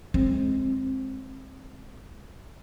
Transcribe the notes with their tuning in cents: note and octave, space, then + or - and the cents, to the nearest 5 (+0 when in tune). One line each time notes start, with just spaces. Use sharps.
G#3 +0 C4 +15